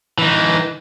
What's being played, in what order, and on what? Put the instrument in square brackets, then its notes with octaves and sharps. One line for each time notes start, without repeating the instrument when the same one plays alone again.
[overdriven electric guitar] E3 D#4